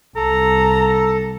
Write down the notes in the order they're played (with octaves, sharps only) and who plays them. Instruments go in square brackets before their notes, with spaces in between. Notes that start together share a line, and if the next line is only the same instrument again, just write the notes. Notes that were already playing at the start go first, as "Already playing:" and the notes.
[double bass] C2 [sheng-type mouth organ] A4 [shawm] A#5